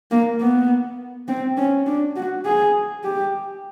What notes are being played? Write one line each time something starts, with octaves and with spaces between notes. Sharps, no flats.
A#3
B3
C4
C#4
D4
F#4
G#4
G4